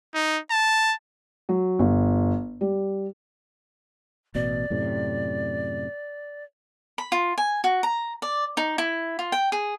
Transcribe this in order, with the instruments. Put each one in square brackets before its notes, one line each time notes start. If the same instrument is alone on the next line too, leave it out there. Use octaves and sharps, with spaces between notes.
[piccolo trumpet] D#4
A5
[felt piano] F#3
G1
G3
[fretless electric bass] A1 B2 [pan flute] D5
[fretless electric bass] F#2 A2 C3
[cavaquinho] B5
F4
G#5
F#4
A#5
D5
D#4
E4
F4
G5
G#4